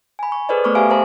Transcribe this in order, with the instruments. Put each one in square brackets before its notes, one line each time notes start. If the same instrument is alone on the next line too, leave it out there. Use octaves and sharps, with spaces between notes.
[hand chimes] G#5 B5
C#6
G#4 A4 B4 C5 D5 D#5
A3 B3 B5 C#6 D6 F6
G4 A4 E5 F5 G#5 D7
A4 A#4 C5 A5 A#5